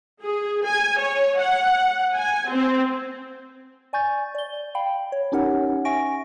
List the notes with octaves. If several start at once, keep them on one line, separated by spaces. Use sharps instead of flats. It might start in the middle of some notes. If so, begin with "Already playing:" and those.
G#4
G#5
C#5
F#5
G#5
C4
D5 G#5 C#6 G6 A6
D5 G7
F5 G5 B5
C#5
C#4 D#4 G4 A#4 C#5 F#5
E5 G#5 C#6 A#6 D7